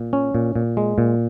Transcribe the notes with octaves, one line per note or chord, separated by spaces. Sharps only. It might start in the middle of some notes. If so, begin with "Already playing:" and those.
Already playing: A#2
C#4
A#2
A#2
G#3
A#2